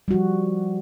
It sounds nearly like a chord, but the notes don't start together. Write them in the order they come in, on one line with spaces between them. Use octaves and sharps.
G3 F#4 F3